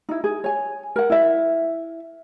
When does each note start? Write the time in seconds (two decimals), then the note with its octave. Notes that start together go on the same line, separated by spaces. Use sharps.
0.09 D#4 E4
0.24 G#4
0.44 C#5 G#5
0.96 A#4 F#5
1.10 E4 E5